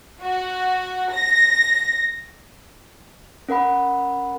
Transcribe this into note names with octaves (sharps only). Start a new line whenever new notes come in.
F#4
A#6
C#4 A#4 F#5 B5